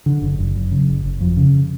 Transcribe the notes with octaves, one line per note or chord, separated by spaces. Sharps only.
D3
F#1
F#1
F#2
C#3
F#1
F#1
F2
C#3